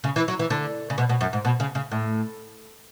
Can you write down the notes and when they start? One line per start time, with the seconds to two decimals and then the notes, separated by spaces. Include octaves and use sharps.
0.04 C#3
0.16 E3
0.28 F#3
0.39 E3
0.50 D3
0.90 C#3
0.98 B2
1.09 B2
1.21 F#2
1.33 G#2
1.45 B2
1.60 C#3
1.75 C#3
1.91 A2